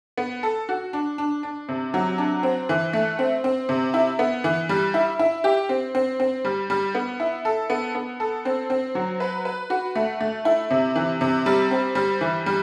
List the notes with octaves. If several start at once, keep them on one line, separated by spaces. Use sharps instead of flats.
B3
A4
F#4
D4
D4
D4
C3
F#3
D4
C4
E3
A3
C4
C4
C3
E4
B3
E3
G3
E4
E4
G4
C4
C4
C4
G3
G3
B3
E4
A4
B3
B3
A4
C4
C4
F#3
B4
B4
F#4
A3
A3
E4
C3
E3
C3
G3
C4
G3
E3
G3